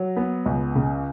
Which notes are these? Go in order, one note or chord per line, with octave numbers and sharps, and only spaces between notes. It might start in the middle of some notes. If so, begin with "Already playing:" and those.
Already playing: F#3
B3
C#2
C#3